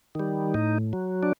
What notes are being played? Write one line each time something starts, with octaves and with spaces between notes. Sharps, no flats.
D#3 G3
A2 D#4
F#3
D4